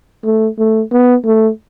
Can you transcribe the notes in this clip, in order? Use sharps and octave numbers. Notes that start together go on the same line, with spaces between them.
A3
A3
B3
A3